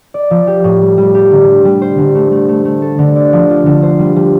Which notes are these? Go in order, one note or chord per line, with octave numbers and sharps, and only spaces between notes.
D5
F3
G4
A2
G3
G3
G4
D3
G3
G3
C5
D3
A3
A3
A3
A3
A4
D3
D5
F3
F4
D3
C5
G3
G3